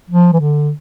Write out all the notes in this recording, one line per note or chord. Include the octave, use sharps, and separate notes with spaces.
F3
E3
D3